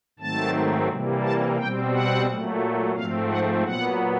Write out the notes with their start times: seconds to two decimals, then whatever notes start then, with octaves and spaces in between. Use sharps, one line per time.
0.19 G#2 D#3 F#3 A3 C4 A5
0.89 C3 E3 G3 A#3
1.23 A5
1.57 B2 G3 C4 G5
1.91 F#5
2.26 A#2 F#3 A3
2.95 G#2 F3 A3 C4 F5
3.29 F#5
3.64 A#2 F#3 B3 F#5